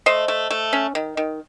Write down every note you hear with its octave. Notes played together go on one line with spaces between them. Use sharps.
A3 C5 D#5
A3
A3
C#4
D#3
D#3